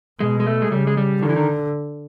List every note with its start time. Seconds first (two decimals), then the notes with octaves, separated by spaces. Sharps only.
0.20 B2 G#3
0.40 G#3
0.47 A3
0.62 G#3
0.71 C#3 G3
0.87 G#3
0.97 G3
1.22 D3 D#3
1.29 E3
1.36 D#3